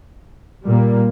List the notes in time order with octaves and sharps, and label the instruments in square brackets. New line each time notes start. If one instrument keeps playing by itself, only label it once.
[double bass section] A#2 G3 A#3